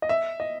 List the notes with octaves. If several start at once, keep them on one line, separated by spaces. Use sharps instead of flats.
D#5
E5
D#5